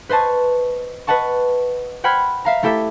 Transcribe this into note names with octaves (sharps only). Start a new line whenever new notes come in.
B4 C5 D#5 A5 C#6
B4 D#5 F#5 A5 C#6
C5 F#5 G5 B5 F6 G#6
E5 F5 A#5
A3 E4 G4 A4 E5